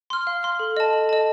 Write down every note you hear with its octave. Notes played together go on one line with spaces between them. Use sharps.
C6 F6
F5
C6 F6
A4
D#5 A5
A4
D#5 A5